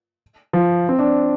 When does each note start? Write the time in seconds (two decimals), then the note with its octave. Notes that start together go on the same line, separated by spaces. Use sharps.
0.53 F3
0.89 C4
0.99 D4